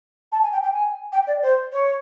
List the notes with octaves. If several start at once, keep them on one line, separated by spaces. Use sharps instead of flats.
A5
G#5
G5
G5
G#5
G5
D5
C5
C#5